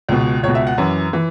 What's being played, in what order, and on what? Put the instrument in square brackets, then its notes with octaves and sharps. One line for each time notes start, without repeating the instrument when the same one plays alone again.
[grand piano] C#2 B2
C#2 C#5
B2
E5
F#5
F#2 E3
E3